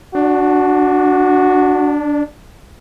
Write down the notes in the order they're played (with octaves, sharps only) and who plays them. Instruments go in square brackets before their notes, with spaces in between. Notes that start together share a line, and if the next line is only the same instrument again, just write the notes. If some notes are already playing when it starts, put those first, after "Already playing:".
[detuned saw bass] D4 [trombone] F#4